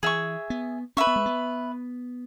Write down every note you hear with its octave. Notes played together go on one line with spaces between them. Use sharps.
E3 G#4 E5 C#6
B3
C#4 B4 E5 C#6
B3
G#3
B3